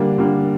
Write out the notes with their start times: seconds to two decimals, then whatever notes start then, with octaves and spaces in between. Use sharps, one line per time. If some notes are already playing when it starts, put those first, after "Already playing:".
Already playing: D3 G3 A#3 D4
0.18 D3 G3 A#3 D4